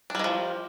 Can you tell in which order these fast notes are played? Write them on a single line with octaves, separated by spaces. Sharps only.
D4 G3 D#3 F3